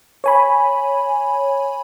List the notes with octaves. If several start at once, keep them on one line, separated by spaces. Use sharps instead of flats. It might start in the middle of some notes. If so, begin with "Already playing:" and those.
C#5 G#5 B5